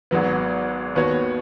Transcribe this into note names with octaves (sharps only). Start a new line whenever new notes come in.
G#1 G#2 F#3 B3
D#2 D#3 B3 F#4 C#5